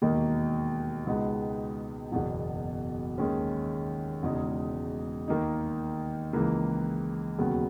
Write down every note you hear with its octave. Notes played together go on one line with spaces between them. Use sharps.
E1 D#2 D#3 A#3 D#4
C#2 B2 G#3 B3 D#4
F#1 E2 B2
D#2 D#3 G#3 C#4
E1 E2 C#3 G#3 D#4
D#2 D#3 A#3 D#4
C#2 C#3 E3 A#3
E1 D#2 C#3 F#3 B3